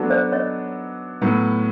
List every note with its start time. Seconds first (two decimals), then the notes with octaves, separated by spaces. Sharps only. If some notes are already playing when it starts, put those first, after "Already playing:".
Already playing: F#3 B3 D4 F#4 A4
0.10 C5 D5
0.32 C#5 D#5
1.22 A2 F#3 B3